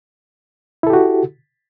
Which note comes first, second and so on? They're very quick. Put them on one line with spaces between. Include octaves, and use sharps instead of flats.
E4 A4 G4 F#4